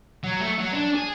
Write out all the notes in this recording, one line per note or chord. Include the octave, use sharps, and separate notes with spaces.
F#3
A3
F#3
D4
G#4